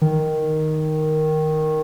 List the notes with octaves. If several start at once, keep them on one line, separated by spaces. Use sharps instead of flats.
D#3